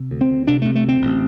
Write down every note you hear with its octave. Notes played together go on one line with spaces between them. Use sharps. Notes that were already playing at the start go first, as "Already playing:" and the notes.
Already playing: C3
D2
C4
D2
C3 D4
C3 A3
A3
D2 C4
A1